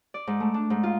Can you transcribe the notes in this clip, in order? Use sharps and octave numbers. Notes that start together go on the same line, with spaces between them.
D5
G#2
A3
D4
G#2
F4